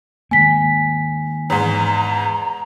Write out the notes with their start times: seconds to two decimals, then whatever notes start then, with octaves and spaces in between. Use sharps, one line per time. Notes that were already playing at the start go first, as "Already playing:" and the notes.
0.31 D#3 G#3 A#3 G#5 B6
1.50 E2 G#2 A#5